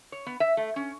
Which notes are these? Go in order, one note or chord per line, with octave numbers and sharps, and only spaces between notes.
C#5
B3
E5
A3
C#4